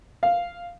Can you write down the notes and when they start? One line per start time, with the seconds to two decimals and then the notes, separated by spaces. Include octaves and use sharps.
0.23 F5